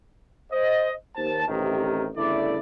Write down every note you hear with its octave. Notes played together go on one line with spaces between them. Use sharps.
C5 D#5
D#2 C5 A5
A1 C3 D#3
G1 C#3 A3 E4 D5